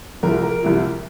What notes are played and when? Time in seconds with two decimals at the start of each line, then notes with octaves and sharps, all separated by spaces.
0.23 C2 C3 F3 A#4
0.43 A#4
0.62 C2 C3 F3